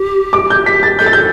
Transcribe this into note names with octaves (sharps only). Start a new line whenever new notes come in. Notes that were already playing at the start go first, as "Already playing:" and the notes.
Already playing: G4
D6
G6
B6
A6
A4 G6
A6
G6